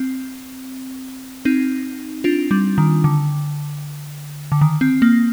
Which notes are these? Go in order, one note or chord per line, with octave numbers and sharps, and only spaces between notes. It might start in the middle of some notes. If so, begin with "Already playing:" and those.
Already playing: C4
C4 D#4
D4 F4
G3
D#3
D3
D3
D#3
C4
A#3